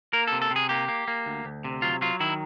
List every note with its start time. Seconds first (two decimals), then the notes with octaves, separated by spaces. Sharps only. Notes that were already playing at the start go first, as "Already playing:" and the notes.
0.13 A#3 A#4
0.27 C3 A4
0.42 A4
0.51 C3
0.56 G#4
0.69 A#3 G4
0.88 A#3
1.08 A#3
1.26 D2
1.45 D2
1.64 C3
1.82 F#3 F4
2.02 F#3 F4
2.20 D#3 E4